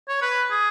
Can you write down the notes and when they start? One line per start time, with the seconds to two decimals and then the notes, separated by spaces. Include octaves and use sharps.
0.08 C#5
0.22 B4
0.50 G#4